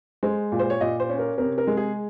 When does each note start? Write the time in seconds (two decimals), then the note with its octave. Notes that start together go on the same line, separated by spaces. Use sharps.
0.23 G#3 C5
0.52 A#2
0.59 C5
0.70 C#5
0.81 A#2 D#5
1.00 C5
1.10 C#4
1.19 A#4
1.38 C3 A#4
1.58 A#4
1.67 G#3
1.77 G#4